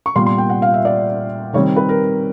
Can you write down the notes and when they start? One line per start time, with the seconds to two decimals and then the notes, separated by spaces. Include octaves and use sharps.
0.06 C#6
0.15 A#2 G3 B3 C6
0.26 C6
0.38 G5
0.50 F#5
0.62 F5
0.74 E5
0.85 D5
1.53 D#3 G3 C4 C#5
1.76 B4
1.89 A#4